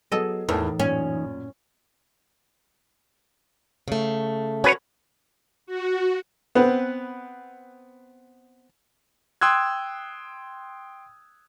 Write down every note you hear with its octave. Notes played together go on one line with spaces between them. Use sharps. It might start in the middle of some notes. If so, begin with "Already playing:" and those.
F#3 B3 G#4 A4 D#5
E2 A2 E3 D#4 A#4 A5
F#2 A#2 C#4
C#3 A3
C#4 F#4 B4 C#5
F#4
B3 C4 B4
G5 C6 D#6 E6 F#6 G#6